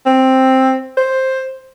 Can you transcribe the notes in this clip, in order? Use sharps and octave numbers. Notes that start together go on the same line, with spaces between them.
C4
C5